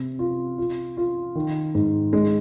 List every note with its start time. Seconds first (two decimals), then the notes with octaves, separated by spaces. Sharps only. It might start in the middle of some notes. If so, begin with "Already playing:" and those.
Already playing: C3
0.19 F4
0.58 F4
0.97 F4
1.35 D#3
1.75 G#2
2.13 G#3